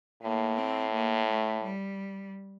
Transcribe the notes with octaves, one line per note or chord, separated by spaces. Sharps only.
A2 A#3
C4
A#3
A3
G3